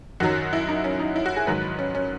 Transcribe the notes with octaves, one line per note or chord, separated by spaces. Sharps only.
F#2 D#3 F#3 F#4
E4
D#4
C#4
D#4
E4
F#4
G#4
G#2 D#3 F#3 B4
C#4
C#4